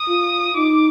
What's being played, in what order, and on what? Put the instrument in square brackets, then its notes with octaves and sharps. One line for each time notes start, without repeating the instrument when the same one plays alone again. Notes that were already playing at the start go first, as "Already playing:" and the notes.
Already playing: [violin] D#6
[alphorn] F4
[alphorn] D#4 [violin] D6